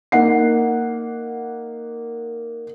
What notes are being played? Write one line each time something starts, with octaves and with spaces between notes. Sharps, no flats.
A#3 D#4 F#5 C7